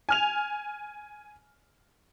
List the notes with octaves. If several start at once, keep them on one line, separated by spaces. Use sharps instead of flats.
G#5 F6 F7